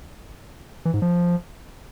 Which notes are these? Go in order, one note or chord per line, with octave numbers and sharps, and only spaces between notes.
E3
G#2
F3